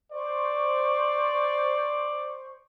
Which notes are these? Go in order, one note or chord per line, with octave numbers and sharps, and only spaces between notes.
C5 D5 C#6